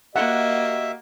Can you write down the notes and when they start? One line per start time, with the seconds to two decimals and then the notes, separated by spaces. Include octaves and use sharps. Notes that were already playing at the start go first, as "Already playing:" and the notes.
0.16 A#3 F#4 G4 D#5 E5 F#5